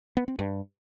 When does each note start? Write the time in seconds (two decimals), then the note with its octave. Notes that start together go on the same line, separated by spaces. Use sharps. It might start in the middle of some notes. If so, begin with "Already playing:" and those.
0.17 B3
0.28 C4
0.39 G2